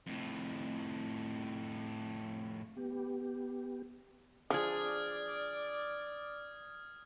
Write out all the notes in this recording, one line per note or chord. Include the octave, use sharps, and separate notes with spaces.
F2 A2
B3 G4
F3 D4 G#4 D5 D#6 F6 G#6